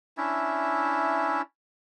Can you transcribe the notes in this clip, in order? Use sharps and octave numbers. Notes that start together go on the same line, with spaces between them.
C#4 D4 E4 E5